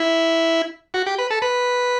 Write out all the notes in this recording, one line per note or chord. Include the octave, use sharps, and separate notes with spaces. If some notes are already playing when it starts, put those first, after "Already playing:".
Already playing: E4
F#4
G4
B4
A4
B4